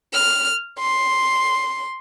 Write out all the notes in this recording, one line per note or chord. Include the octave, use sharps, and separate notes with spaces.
F6
C6